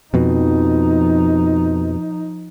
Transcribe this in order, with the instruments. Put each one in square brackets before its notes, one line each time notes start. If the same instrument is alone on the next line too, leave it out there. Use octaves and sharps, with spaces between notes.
[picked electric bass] F2 B2 [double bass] F3 D#4